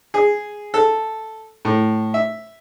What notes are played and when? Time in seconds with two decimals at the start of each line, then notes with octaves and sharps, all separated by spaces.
0.14 G#4
0.74 A4
1.65 A2
2.14 E5